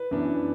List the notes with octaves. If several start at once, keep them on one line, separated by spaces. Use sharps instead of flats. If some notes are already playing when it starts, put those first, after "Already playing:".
Already playing: B4
F#2 E3 B3 D4